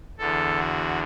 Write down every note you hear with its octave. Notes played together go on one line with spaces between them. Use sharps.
E2 D3 A4
F#4